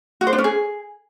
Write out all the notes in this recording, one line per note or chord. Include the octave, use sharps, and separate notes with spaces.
F#4
C5
D4
C#4
G#4